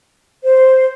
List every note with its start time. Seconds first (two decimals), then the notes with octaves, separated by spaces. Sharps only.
0.44 C5